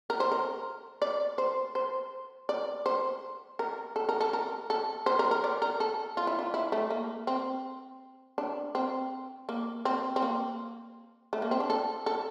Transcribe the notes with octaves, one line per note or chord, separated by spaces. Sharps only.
A#4
C5
A#4
D5
C5
C5
D5
C5
A#4
A4
A#4
A4
A#4
A4
C5
A#4
A#4
D5
A#4
A4
F4
E4
F4
E4
A3
A#3
C4
D4
C4
A#3
C4
C4
A#3
A3
A#3
C4
D4
A4
A4